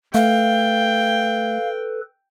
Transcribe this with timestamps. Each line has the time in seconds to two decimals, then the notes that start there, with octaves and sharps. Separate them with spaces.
0.15 A3 A4 B4 F5 G5